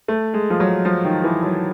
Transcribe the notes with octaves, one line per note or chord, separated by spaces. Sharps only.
A3
G#3
F3
F#3
F3
D#3
E3
F#3